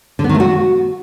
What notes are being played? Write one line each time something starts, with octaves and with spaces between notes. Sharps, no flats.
D3
B3
D#3
A3
F#4